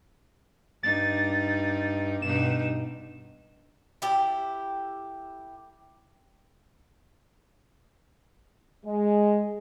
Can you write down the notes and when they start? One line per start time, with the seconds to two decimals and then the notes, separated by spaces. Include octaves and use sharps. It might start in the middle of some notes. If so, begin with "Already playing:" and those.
0.83 G2 D#4 A6
2.22 G2 B2 D#4 E7
4.02 E4 G4 A4
8.85 G#3